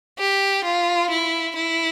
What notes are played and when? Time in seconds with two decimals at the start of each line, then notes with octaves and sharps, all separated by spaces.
0.19 G4
0.64 F4
1.10 E4
1.56 E4